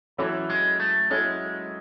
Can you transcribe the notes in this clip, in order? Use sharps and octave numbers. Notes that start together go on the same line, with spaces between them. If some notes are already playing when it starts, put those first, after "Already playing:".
E3 F#3 C#4 E4 A4 C#5
G#3
A3
F#3 G#3 C#4 E4 A4 C#5